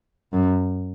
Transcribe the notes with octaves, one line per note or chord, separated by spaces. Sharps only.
F#2